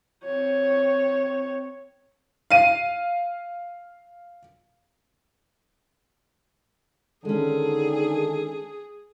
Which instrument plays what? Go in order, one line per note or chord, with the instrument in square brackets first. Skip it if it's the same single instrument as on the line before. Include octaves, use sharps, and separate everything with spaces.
[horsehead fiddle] C4 C#5
[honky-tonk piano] F5 D#7
[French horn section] D3 D#3 [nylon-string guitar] G#3 C#4 [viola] G#4 [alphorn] A4